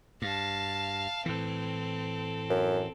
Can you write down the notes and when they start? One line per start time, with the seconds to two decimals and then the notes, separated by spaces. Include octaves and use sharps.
0.22 G2 F5 A5
1.26 A2 E3 C4 A4
2.50 F#2